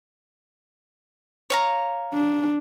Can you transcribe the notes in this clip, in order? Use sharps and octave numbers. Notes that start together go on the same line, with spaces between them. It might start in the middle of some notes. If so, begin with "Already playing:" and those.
C#5 F5 A#5
D4